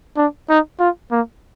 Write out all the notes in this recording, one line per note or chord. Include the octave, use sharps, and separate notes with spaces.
D4
D#4
F4
A#3